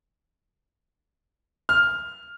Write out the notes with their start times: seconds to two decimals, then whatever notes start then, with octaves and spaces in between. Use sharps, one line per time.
1.69 F6